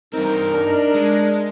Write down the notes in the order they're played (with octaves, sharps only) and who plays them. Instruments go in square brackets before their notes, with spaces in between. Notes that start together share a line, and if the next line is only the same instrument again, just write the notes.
[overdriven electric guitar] G2 C4 [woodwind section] D#4 [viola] A#4
[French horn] D4
[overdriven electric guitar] G#3